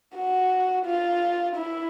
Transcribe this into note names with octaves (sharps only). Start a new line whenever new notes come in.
F#4
F4
E4